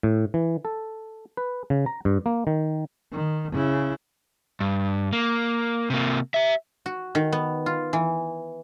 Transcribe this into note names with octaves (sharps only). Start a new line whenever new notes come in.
A2
E3
A4
B4
C#3
A#5
G2
A#3
D#3
D#3
C#3 E4
G2
A#3
C3 A#3
G4 E5
F#4
D#3
B3
F4
E3